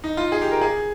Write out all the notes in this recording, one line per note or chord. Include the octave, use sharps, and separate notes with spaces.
D#4
F4
G#4
G4
A#4
G#4